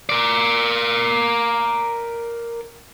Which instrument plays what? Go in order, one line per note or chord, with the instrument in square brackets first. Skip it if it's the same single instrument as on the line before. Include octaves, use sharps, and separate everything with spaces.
[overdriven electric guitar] A#4 D5